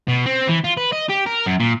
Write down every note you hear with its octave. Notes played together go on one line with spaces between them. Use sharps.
B2
C4
E3
F4
B4
D#5
G4
A#4
F#2
A#2